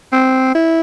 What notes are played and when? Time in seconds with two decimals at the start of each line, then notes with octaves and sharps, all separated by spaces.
0.12 C4
0.55 E4